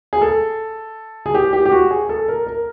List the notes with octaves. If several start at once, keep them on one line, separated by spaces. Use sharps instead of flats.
G#4
A4
G#4
G4
G4
G4
F#4
G#4
A4
A#4
A#4